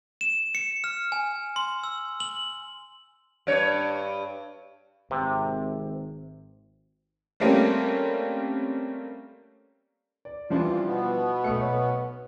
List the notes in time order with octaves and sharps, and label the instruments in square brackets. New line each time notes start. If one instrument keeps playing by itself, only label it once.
[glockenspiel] E7
C#7
F6
G#5
C6
E6
F#7
[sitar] G2 C#5
[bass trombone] G#1 [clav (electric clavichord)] C3
[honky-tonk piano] G3 A3 A#3 C4 C#4
[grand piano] D5
[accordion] E3 F4 [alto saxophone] F3 [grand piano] G3 D4 E4
[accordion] B2 B3
[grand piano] B1 C#7 [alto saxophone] A3
[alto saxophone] C#5